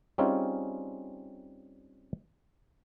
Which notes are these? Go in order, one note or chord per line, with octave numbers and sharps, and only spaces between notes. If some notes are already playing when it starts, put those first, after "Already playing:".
G3 C4 C#4 D#4 F4 G#4